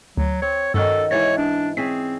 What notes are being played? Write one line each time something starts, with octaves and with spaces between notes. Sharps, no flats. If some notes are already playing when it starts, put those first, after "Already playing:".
D2 F#3
C4 C#5
G2 D#3 C#4 F#4 A4 F6
G#2 E3 C#5 A6
D4
C4 C#4 G#4 B6